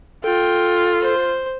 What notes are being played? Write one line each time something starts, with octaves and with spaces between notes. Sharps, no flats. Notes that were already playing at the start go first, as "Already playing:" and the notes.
F4 A4 G5
C5